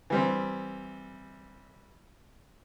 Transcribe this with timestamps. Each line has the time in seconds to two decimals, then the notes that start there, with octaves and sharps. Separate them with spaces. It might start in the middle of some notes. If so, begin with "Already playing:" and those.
0.10 E3 G3 C4